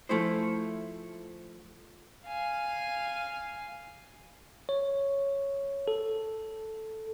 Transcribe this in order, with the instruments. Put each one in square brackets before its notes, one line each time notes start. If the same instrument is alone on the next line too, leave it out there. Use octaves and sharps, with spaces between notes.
[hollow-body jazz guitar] F3 A3 E4 C5
[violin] F5 G#5
[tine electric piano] C#5
A4